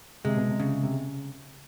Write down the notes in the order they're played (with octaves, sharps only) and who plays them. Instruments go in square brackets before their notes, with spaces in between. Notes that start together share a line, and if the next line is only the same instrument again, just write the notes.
[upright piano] C3 [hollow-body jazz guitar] G#3
[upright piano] B2
C3
[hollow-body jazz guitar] C#3
[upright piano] C3